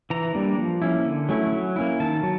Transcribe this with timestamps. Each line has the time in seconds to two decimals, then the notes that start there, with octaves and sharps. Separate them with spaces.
0.10 E3 A#5
0.35 G3 A#3 D4
0.58 F3
0.82 A#3 C#4 E4
1.05 D3
1.29 F#3 A3 C#4 E4
1.53 F#3
1.76 A#3 C#4 E4
2.00 D#3 A5
2.23 F#3